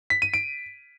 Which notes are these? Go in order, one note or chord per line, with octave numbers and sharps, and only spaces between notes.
B6
D#7
D7